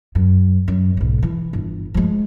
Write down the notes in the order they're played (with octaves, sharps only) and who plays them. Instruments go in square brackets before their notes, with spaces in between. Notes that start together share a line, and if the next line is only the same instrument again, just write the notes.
[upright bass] F#2
F#2
B1 G#2
E3
G1
F3 G#3